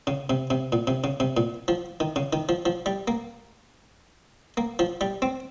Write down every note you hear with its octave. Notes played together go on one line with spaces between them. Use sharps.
C#3
C3
C3
A#2
C3
C#3
C3
A#2
F3
D#3
C#3
D#3
F3
F3
G3
A#3
A#3
F3
G3
C4